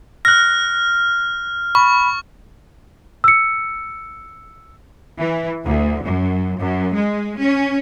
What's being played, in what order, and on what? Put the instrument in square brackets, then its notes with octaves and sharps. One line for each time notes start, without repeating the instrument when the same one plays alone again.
[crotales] F6 [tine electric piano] F#6 A#6
[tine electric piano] B5 [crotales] C#6
[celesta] E6 C#7
[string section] E3
D2
F#2
F#2
G#3
C#4